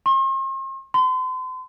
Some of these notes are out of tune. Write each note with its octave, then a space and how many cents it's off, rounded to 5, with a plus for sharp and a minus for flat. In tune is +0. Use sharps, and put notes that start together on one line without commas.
C6 +45
C6 -40